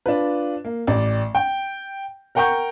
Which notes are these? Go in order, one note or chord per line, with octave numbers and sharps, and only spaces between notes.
D4 F4 B4
A#3
A1 D5
G5
A#4 F#5 G5 A#5 C#6 G6